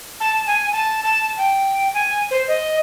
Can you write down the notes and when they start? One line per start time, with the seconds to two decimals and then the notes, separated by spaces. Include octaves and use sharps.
0.20 A5
0.47 G#5
0.72 A5
1.03 A5
1.38 G5
1.94 G#5
2.31 C5
2.48 D#5